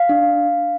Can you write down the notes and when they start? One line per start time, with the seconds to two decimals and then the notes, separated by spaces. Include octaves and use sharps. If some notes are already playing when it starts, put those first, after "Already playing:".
Already playing: F5
0.09 D4